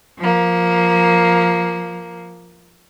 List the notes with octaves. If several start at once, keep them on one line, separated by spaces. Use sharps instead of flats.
F3 A#3